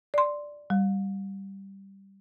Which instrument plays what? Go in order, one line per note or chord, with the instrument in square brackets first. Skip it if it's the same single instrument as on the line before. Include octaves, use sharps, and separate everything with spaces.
[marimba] D5 C6
G3